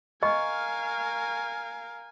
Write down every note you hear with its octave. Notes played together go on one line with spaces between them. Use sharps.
A#4 D#5 F5 G#5 C#6